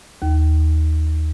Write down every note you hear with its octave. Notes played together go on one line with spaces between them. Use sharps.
D#2